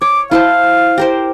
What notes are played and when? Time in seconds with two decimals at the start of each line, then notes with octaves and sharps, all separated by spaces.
0.02 C#5 D6
0.31 E4 C5 F5 A5
0.98 G4 A#4 C5